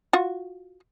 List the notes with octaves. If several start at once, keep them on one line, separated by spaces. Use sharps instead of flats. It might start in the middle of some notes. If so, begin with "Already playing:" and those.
F4 F#4